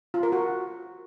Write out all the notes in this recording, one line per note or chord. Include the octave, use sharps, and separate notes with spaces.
F4
A#4
F#4